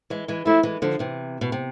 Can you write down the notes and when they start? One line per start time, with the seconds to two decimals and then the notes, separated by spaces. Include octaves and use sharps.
0.10 E3 G#3
0.28 E3 G#3
0.46 F3 A3 E4
0.63 E3 G#3
0.82 D3 F3
0.99 C3 E3
1.41 B2
1.52 C3